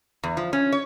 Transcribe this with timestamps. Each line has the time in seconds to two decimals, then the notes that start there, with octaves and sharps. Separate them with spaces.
0.24 E2
0.37 F3
0.53 C#4
0.73 C#5